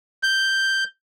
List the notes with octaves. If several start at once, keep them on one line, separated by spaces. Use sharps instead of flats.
G6